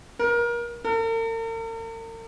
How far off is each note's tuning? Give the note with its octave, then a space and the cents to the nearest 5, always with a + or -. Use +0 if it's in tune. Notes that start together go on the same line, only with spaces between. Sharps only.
A#4 +30
A#4 -45